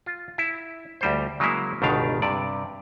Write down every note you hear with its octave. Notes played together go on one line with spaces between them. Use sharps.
F4
E4
D2 G3 C5
C#3 F#3 G#3 A#3 E4
G1 C#2 B2 D#3 D4 F5
G2 C3 D5